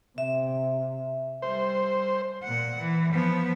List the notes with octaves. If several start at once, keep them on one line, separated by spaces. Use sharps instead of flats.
C3 E5
G3 C5
A#2 F#5
E3
F3 B3